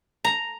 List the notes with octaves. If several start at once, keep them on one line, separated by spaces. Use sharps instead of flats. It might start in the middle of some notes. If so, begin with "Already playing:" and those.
A#5